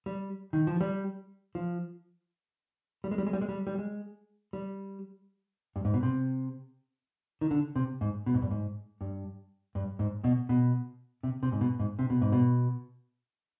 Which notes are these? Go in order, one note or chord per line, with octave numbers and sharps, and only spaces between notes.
G3
D#3
F3
G3
F3
G3
G#3
G3
G#3
G3
G#3
G3
G3
G#3
G3
G2
G#2
B2
C3
D#3
D3
C3
G#2
B2
G#2
G2
G#2
G2
G2
G#2
B2
B2
C3
C3
G#2
B2
G#2
C3
B2
G#2
B2